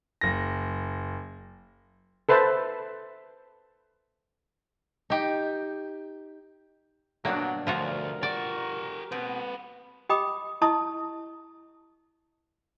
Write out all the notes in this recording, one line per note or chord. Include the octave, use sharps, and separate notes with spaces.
F#1 A#6
A4 B4 C5 E5 A5
D#4 G4
G2 B2 F#3 A#3 D4
D2 F3 F4 F#4 A#4
G4 D5 F#5
B2 C4 B4
G4 D#5 G5 B5 D6 D#6
E4 D#5 A5 C#6 D#6